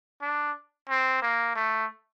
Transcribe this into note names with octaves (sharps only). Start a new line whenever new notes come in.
D4
C4
A#3
A3